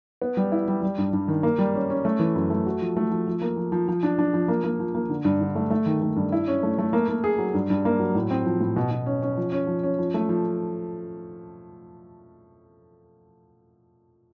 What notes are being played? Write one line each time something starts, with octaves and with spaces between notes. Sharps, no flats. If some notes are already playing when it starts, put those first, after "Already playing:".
B3
G3
E4
G3
G3
G2
G2
D#3
A#3
G3
C#4
C#4
A3
E3
F#2
A3
F#4
F3
A3
F3
F3
A#3
F3
F3
F3
D4
D4
F3
A#3
A#3
F3
A#3
D3
G2
D3
A3
A3
D#3
A3
G2
E4
C#4
A3
A3
A#3
A#3
G#4
F#3
G2
G2
A#3
F#3
A2
C4
F3
A2
B2
B2
C#4
C#4
F3
C#4
F3
C#4
F3
A3
F3